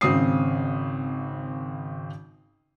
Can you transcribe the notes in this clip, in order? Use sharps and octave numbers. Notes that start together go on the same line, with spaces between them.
G#1 C#3 C4 D#6 C7